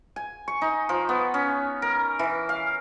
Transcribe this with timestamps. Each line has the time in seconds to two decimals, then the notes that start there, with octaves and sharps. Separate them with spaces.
0.16 G#5
0.48 C#6
0.62 D#4
0.89 F3
1.09 B3
1.34 C#4
1.82 A#4
2.19 E3
2.49 F5